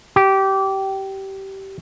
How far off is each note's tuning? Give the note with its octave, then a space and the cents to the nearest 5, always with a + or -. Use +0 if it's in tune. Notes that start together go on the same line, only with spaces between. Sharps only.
G4 -20